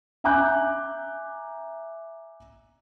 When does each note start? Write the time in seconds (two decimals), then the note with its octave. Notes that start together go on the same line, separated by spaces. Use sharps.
0.24 E5 G#5 A#5 D6 F#6 G6